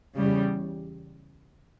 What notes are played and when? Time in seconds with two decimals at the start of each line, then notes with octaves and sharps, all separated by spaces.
0.16 E2 C#3 G3